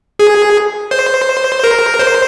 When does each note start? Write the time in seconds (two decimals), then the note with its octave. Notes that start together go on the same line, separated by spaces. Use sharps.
0.19 G#4
0.91 C5
1.64 A#4
1.99 C5